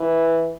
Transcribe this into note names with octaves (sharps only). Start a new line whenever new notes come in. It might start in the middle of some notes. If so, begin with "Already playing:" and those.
Already playing: E3